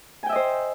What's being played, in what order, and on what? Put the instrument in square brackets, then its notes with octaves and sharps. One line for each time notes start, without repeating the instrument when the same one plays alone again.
[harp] G#5
G5
E5
D#5
C5